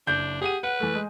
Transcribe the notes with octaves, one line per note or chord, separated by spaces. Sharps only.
F#1 D4 G6
G4 G#4 F#5 D#7
B4 F#5
E3 A3
G#3